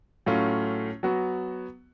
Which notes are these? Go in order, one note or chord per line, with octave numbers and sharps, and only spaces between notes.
A2 F#3 A3 C#4 F4
F#3 B3 F#4